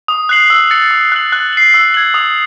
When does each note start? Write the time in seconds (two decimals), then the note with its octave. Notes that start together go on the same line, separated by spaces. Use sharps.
0.08 D#6
0.29 F#6 C7 F#7
0.50 E6
0.71 A6 C#7
0.91 D#6
1.12 F#6 C7 F#7
1.32 F#6
1.53 C7 F#7
1.74 E6
1.94 G#6 C7 F#7
2.14 D#6